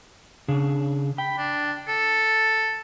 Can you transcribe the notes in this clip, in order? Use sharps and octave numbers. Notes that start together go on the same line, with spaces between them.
C#3 D4 G#4
G5 B5
D4
A4